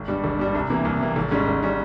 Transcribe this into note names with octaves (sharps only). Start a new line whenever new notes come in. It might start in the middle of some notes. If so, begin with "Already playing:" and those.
Already playing: G#1
G2 G3
G#1
G2 G3
C2
C3 E3 A#3
C2
C3 E3 A#3
G#1
G#2 G3 C#4
G#1
G3 C#4